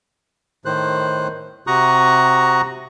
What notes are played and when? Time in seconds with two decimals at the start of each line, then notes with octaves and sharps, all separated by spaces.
0.65 A2 D#3 C5 F#6
1.67 C3 F#4 A#5 C#6 D#6 F#6